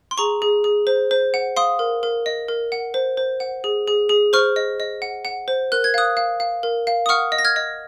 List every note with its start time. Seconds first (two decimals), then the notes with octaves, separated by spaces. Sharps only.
0.11 C6
0.18 G#4 A#5 C#6
0.42 G#4
0.64 G#4
0.87 C5
1.11 C5
1.34 F#5
1.57 F5 C6 D#6
1.79 A#4
2.03 A#4
2.26 D#5
2.48 A#4
2.72 F#5
2.94 C5
3.17 C5
3.40 F#5
3.64 G#4
3.87 G#4
4.09 G#4
4.33 C5 C#6 F6
4.56 D#5
4.80 D#5
5.02 F#5
5.25 F#5
5.48 C5
5.72 A#4 F#6
5.84 G#6
5.94 F5 D#6 F#6
6.17 F5
6.40 F5
6.63 A#4
6.87 F5
7.06 D#6
7.09 F#5 C#6 F6
7.32 D#5
7.39 A#6
7.44 F6 G#6
7.56 D#5